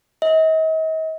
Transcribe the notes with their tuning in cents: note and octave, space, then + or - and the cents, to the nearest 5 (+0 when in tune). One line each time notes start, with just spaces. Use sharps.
D#5 +40